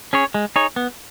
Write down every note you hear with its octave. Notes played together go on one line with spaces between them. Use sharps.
C#4 G#4 C#5
G#3
D#4 G#4 C#5
B3